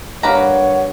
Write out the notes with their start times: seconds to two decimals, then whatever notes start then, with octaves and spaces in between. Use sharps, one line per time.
0.23 G2 A#3 B4 C#5 F#5 A#5